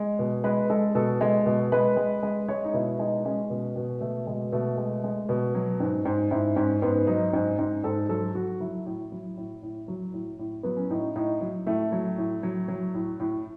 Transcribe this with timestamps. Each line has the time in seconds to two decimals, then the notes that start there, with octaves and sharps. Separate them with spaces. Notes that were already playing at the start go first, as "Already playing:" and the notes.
Already playing: G#3
0.19 B2
0.44 G#3 B4
0.70 G#3 A4
0.95 B2 A4
1.21 G#3
1.46 B2
1.72 G#3 B4
1.97 G#3
2.23 G#3
2.48 G#3 C#5
2.64 D#4
2.74 B2 E4
2.99 G#3 D#4
3.25 G#3 C#4
3.50 B2
3.76 B2
4.01 B2 A3
4.27 B2 G#3
4.52 B2 A3
4.78 G#3 A3
5.04 G#3
5.29 B2
5.55 F#3
5.80 G#2
6.05 G#2
6.31 G#2 E4
6.56 G#2 C#4
6.82 G#2 B3
7.07 F#3 D#4
7.33 G#2
7.59 G#2
7.84 G#2 A4
8.09 F#3 A4
8.35 F#3 F#4
8.60 F#3 E4
8.86 A2
9.12 F#3
9.37 A2
9.63 A2
9.88 F#3
10.14 A2
10.39 A2
10.63 F#3 B3
10.77 C#4
10.90 A2 D#4
11.16 A2 D#4
11.41 F#3
11.67 A2 A3
11.92 F#3
12.18 A2
12.43 F#3
12.68 F#3
12.95 A2
13.20 A2